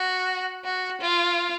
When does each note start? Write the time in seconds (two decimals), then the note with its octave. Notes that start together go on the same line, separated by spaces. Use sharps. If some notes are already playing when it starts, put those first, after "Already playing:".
Already playing: F#4
0.64 F#4
1.01 F4